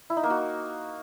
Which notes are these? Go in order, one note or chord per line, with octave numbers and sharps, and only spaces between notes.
E4
D#4
A#3
F#4